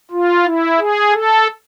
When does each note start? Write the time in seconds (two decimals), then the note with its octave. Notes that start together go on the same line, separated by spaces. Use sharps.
0.11 F4
0.45 E4
0.79 G#4
1.12 A4